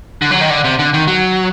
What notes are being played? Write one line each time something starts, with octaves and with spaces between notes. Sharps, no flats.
D3
F#3
D#3
D3
C3
D3
D#3
F#3